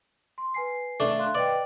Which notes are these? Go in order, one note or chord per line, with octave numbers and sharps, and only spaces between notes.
C6
B4 G#5 C7
A3 D4
F5 C6 F#6
B4 D5 D#5 G5